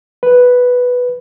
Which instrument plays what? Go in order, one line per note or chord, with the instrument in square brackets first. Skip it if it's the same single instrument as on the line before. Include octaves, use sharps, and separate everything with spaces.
[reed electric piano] B4